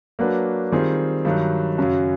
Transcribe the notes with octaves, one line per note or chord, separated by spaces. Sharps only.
F#3 A#3 D4 F#4 B4
D#3 G3 C4 F4 G#4
G2 D#3 F#3
F#2 C#3 F#3